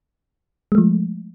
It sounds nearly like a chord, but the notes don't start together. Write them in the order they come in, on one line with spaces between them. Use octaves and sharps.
G#3 A3 F3